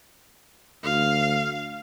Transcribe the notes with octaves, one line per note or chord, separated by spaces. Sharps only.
D2 F5